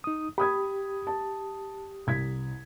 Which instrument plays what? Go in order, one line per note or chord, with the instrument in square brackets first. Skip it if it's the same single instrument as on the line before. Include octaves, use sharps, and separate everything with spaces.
[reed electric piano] D#4 D#6
[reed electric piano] G4 [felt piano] B5 D#6 G#6
[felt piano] A5
C2 G#6 B6